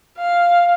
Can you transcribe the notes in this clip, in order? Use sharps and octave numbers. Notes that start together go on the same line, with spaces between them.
F5